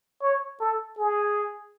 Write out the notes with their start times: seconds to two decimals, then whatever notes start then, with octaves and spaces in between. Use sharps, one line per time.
0.22 C#5
0.60 A4
0.98 G#4